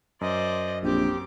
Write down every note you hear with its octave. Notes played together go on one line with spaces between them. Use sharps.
F#2 C5 D5 D#5
A#1 C4 G4 D6